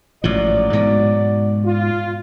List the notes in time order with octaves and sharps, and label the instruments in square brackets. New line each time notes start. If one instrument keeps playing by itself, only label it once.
[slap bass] A1 G#2 F3 [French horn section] F#3 D5
[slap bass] G#2 B2
[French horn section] F4